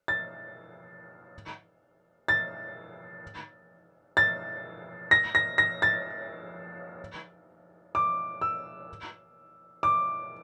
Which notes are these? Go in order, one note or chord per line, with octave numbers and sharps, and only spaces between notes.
A6
A6
A6
A#6
A#6
A#6
A6
D6
E6
D6